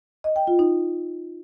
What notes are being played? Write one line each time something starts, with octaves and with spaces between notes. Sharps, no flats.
D#5
G5
F4
D#4